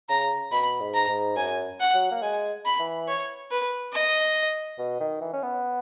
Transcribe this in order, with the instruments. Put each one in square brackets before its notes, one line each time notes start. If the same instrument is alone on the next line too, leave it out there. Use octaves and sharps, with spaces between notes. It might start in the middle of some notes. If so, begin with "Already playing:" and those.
[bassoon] C#3 [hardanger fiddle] A#5
[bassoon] B2 [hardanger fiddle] B5
[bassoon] G#2
[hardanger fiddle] A#5
[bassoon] G#2
[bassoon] F#2 [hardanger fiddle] G#5
[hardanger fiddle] F#5
[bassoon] F#3
A#3
[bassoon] G#3 [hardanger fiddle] G#5
[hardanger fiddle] B5
[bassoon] E3
[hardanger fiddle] C#5
B4
D#5
[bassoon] B2
D#3
E3
C#4
B3